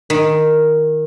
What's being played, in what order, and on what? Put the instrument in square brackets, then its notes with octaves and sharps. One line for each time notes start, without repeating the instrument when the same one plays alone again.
[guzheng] D#3